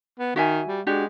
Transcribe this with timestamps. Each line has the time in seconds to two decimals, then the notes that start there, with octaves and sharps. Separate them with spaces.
0.19 B3
0.36 D#3 F#4 E5 G#5
0.68 G3
0.87 G#3 D4 F#4 G4